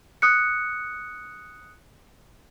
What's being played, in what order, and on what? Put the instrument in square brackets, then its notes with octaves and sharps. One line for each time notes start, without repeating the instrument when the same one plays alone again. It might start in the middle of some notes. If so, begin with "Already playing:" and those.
[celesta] D#6 F#6 C#7